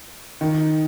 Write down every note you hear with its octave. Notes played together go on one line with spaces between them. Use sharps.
D#3